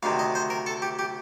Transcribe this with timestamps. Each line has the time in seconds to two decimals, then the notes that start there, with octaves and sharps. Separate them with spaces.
0.03 D2 C3 D#3 F5
0.19 D#5
0.35 C5
0.50 A#4
0.66 A4
0.82 G4
0.99 G4